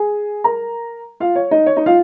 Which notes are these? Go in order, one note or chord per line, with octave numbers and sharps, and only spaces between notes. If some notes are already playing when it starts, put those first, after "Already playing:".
Already playing: G#4 G#5
A#4 A#5
F4 F5
C#5
D#4 D#5
C#5
D#4 D#5
F4 F5